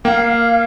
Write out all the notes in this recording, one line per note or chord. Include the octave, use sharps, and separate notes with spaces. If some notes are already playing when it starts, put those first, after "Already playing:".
A#3 F5 G5